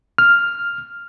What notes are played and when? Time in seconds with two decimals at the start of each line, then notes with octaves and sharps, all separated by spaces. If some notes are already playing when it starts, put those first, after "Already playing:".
0.18 F6